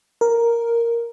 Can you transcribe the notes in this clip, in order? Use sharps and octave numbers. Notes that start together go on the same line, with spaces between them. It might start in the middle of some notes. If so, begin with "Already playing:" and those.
A#4